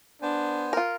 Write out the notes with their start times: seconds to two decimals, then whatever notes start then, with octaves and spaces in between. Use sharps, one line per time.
0.22 B3 D4 C5 G#5
0.73 F4 A#4